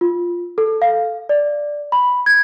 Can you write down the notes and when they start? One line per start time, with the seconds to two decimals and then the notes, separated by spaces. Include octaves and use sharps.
0.01 F4
0.58 A4
0.82 F5
1.29 D5
1.92 B5
2.26 G#6